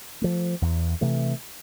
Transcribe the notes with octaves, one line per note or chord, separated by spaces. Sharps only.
F3 A3
E2
C3 E3 A3